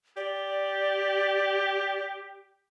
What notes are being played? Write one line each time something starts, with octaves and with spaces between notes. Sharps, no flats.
G4 D5